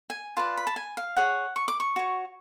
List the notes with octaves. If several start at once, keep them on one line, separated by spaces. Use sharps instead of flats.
G#5
F4 B4 D5 A5
B5
A5
G#5
F5
G#4 C#5 F#5
C#6
D6
C#6
F#4 C#5